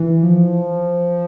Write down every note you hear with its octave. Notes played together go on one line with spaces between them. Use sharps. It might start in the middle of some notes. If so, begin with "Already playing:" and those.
Already playing: E3
F3